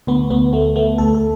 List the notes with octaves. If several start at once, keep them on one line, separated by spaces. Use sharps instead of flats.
D2 B3
D2 B3
A3 B3
A3 B3
D2 A4
A4